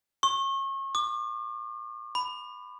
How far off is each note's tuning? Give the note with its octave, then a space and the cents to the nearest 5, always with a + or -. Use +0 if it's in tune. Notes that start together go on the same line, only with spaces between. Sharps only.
C#6 -35
D6 +40
B5 +15